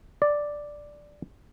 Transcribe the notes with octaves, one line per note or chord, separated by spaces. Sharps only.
D5